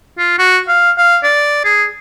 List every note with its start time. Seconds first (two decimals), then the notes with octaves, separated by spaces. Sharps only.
0.18 F4
0.38 F#4
0.68 F5
0.97 F5
1.23 D5
1.64 G#4